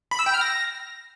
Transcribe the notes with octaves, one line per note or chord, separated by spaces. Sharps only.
B5
E6
G5
F6
A#6